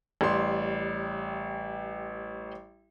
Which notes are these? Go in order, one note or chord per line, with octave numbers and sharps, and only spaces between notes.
A1 G3 C6